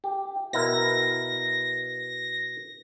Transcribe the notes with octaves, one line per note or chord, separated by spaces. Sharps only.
G4
B2 E4 A#4 A#6